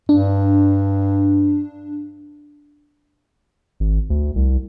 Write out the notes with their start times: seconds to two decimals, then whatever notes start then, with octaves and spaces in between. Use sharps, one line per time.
0.09 G2 D4
3.80 G#1
4.10 D2
4.36 C2